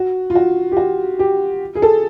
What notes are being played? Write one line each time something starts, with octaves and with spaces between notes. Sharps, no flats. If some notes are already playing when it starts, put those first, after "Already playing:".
Already playing: F#4
F4
F#4
G4
F#4
G4
G#4
A4